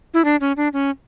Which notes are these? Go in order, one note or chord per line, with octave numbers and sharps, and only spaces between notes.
E4
D4
C#4
D4
C#4